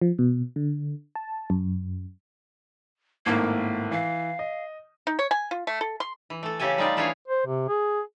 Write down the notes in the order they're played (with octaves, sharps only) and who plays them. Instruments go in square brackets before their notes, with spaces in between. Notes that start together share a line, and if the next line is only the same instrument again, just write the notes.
[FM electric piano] F3
B2
D3
A5
F#2
[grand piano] G#1 A2 A#4 [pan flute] A#3
[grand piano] E3 [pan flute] F5
[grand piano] D#5
[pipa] D#4
C#5
G#5
F4
A3
A4
C6
[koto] E3
A3 A4
C#3 A3 G4 A4 G#5
G3 D#4 F4 D5
E3 D4 E4 G#4 C#5 F5
[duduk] C5
C3
G#4